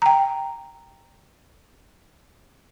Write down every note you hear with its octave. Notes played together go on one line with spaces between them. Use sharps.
G5 A#5